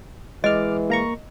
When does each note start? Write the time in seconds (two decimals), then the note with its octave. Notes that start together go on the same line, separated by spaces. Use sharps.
0.44 E3 G#3 D#5 D6 F6
0.90 A#3 A#5 C#6